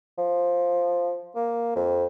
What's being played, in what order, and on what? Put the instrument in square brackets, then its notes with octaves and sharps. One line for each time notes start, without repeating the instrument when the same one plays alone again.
[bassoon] F3
A#3
F2